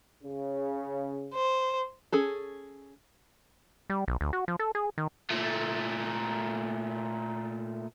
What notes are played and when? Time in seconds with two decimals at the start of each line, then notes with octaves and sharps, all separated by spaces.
0.23 C#3
1.34 C5
2.12 C#4 G#4 A4
3.90 G3
4.08 B1
4.21 D2
4.33 F#4
4.48 F3
4.59 A4
4.75 G#4
4.98 D#3
5.30 A#2 A3